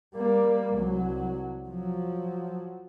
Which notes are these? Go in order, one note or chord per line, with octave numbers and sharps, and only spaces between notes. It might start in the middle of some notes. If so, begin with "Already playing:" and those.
G3 A#3
C2 F#3
F3 F#3